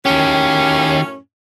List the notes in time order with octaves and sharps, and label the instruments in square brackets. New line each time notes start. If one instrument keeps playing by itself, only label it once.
[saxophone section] F#2 A2 C#4 [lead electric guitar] D#3 G4